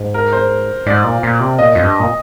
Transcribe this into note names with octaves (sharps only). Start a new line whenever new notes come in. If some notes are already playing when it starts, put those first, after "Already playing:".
Already playing: G#2
A#4
C5
G#2 D5
A#2
A#2
C3
A#2 D#5
F2
G2
A#2